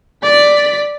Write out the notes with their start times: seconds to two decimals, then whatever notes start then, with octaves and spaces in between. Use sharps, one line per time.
0.23 D5 B6